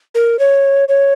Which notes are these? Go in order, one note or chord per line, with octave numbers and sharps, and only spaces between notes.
A#4
C#5
C#5